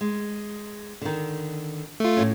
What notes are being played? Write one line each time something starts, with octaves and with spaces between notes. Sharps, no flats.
G#3
D3 D#3
A3 F4
A2 C#4